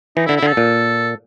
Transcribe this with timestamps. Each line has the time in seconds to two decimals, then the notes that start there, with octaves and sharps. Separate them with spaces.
0.17 E3 D#4
0.26 E4
0.29 D3
0.37 E4
0.43 D3 A4
0.57 A#2